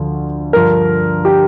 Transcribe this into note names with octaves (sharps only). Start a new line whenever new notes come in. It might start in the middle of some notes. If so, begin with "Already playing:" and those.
Already playing: D2 D3 F3
G2 D3 F3 A#4
G4